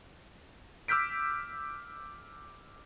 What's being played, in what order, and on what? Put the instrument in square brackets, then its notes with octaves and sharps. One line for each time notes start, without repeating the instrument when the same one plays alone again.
[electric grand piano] D6 E6 F6 G6 B6 D7